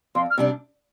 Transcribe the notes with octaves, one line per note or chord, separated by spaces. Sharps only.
F2 C6
F6
C3 G3 D4